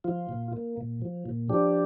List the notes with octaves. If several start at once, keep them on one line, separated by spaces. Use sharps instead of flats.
F3 F4
A#2
A#3
A#2
F3
A#2
F3 D4 G4